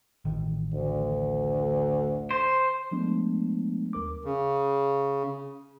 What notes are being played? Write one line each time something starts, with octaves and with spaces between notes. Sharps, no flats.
A1 D#3
D2
C5
F3 G#3 A3 B3 D4
D#2 A#4 D6
C#3